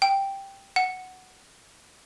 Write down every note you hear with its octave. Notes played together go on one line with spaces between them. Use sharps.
G5
F#5